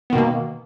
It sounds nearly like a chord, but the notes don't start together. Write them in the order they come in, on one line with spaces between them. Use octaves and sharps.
B3 D#3 B2 A#3